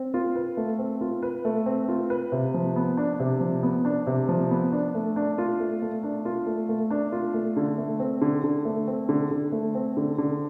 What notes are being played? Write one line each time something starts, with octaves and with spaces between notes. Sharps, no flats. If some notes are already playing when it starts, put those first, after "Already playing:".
Already playing: C4
F4
B4
A3
C4
F4
B4
A3
C4
F4
B4
C3
F3
B3
D4
C3
F3
B3
D4
C3
F3
B3
D4
A3
D4
F4
A3
A3
D4
F4
A3
A3
D4
F4
A3
D3
A3
C4
D3
D3
A3
C4
D3
D3
A3
C4
D3
D3